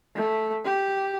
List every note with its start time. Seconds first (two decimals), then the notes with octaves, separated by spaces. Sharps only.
0.15 A3
0.65 G4